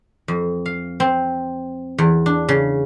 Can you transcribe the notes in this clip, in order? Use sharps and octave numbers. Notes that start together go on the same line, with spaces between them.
F2
F5
C4
E2
D4
C#3